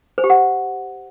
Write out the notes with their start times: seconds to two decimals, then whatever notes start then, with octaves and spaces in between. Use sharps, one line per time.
0.18 C5
0.24 G4
0.30 F#5